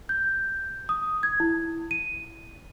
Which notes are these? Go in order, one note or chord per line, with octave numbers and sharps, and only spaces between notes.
G6
D#6
G#6
E4
D#7